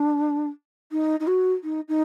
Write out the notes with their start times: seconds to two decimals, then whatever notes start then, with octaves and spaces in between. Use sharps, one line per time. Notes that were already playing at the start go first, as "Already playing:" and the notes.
Already playing: D4
0.92 D#4
1.20 D#4
1.27 F#4
1.64 D#4
1.89 D#4